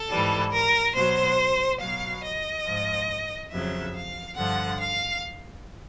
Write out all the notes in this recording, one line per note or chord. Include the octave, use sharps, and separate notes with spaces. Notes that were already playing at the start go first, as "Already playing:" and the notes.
Already playing: A4
G#2 E3 G3
A#4
B2 F#3 C5
B2 F#3 F5
D#5
G#2 F3
F2 C#3 F#3 E5
F5
G2 D3 F3 F#5
F5